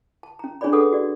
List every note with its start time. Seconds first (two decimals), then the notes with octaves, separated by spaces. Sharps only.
0.23 A5
0.39 C#4 A#5
0.61 C#4 D4 G#4 C#5 D5 B5
0.73 G#4 A4 B4 F#5 D#6
0.92 F#4 D5